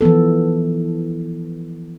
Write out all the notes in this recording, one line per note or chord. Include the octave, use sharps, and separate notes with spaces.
E3 F3 B3 A4